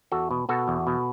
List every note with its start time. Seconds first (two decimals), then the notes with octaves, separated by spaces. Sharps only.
0.12 E2 F#4 A4
0.31 B2
0.49 B2 F#4 A4
0.68 E2
0.87 B2